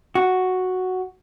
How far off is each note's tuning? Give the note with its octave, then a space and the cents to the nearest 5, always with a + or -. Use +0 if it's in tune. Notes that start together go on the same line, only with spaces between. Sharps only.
F#4 +0